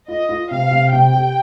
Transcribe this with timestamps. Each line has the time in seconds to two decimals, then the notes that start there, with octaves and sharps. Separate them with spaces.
0.08 F4 D#5
0.29 F4
0.51 C3 F5
0.71 C3
0.92 C3 G5
1.13 G4